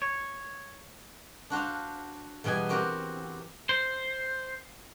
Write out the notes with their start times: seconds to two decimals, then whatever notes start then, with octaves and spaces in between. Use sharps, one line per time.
0.02 C#5
1.50 D4 F#4 C5 F5
2.44 E2 B2 G3 G#4 G#5
2.69 C4 F#4 G4 A#4 C5
3.69 C5